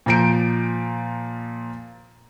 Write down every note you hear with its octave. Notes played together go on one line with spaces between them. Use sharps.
A#2 F3 A#5 G6 D7